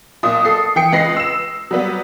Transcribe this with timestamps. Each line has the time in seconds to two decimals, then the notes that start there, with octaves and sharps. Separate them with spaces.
0.23 B1 A#2 D#6
0.45 A4 C7
0.76 E3 G5 C#7
0.92 C#2 B4 D#5 A#6 C7
1.16 E6 E7
1.71 F#3 G3 B3